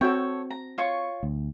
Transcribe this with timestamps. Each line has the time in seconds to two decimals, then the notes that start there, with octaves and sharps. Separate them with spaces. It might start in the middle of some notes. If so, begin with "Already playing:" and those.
0.01 C4 F#4 A4 C#5 E5 G5
0.50 A#5
0.78 F4 C#5 C#6
1.23 D2